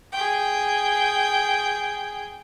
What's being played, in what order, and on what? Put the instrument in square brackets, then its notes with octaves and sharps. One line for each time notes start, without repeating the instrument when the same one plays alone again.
[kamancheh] G#4 G5